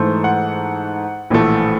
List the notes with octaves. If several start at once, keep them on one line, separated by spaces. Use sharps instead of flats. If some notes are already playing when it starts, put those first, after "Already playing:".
Already playing: G#2 E3 A3 C5
F#5
A#1 A2 E3 A3